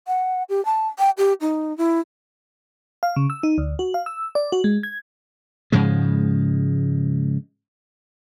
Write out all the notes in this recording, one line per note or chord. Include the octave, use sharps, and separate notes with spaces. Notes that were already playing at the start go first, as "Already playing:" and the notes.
F#5
G4
A5
G5
G4
D#4
E4
F5
C#3
E6
D#4
D2
F#4
F5
E6
D5
F#4
G#3
G#6
G#2 C#3 F3 G#3